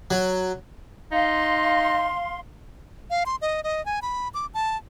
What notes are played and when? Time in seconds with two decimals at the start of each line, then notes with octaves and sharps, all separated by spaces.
0.11 F#3
1.12 D#4 F5 C6
3.10 F5
3.26 C6
3.42 D#5
3.64 D#5
3.86 G#5
4.02 B5
4.34 D6
4.54 A5